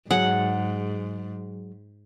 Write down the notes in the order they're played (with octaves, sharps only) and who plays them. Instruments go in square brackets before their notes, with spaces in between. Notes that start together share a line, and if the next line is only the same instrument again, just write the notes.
[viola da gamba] G#2 [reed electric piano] F#3 G#4 [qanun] F#5